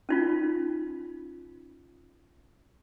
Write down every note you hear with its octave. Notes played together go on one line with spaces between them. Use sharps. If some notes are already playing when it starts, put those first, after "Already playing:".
C#4 D#4 F4